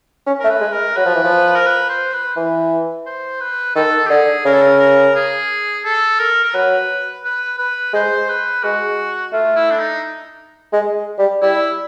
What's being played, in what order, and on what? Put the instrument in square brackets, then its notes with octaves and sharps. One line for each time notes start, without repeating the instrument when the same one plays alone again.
[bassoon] C#4
[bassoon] A3 [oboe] A#4
[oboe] B4
[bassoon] G#3
[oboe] A#4
[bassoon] F#3 [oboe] B4
[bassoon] F3
E3
F3
[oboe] A#4
B4
C5
B4
[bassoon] E3
[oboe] C5
B4
[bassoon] D#3 [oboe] A4
[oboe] G4
[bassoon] D3 [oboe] G#4
[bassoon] C#3 [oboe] A#4
[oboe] A4
A#4
A#4
G#4
A4
A#4
A#4
[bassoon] F#3 [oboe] B4
[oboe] B4
B4
[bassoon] G#3 [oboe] C5
[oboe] B4
[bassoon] G#3 [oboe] F#4
[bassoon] A3 [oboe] F4
[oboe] E4
D4
D#4
[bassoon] G#3
G3
[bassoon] G3 [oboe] E4